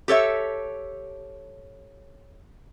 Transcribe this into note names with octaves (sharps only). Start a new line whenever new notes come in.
G4 A4 C#5 E5